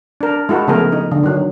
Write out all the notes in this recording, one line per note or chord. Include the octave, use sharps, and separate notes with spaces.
D4 A#4
G#3 E4 F#4 A4 A#4
C#3 F3 A3 B3 G#4 A#4
D#4
D3
D#3 F#3